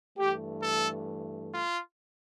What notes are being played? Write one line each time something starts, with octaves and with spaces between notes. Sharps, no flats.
G2 E3 A3 G4
A4
F4